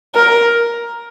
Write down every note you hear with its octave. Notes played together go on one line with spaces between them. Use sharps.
A#4